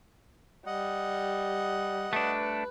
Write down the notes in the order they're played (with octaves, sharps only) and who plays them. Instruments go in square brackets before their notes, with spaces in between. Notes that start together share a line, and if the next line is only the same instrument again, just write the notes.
[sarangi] G3 [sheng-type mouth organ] D#5 F#5
[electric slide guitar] A3 D4 [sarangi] B4